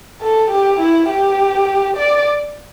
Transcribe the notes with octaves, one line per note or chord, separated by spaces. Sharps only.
A4
G4
E4
G4
D5